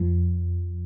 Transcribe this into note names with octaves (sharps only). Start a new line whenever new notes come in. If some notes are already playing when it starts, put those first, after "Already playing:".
Already playing: F2 F3